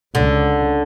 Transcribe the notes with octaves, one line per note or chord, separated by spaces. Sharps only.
C#2 D3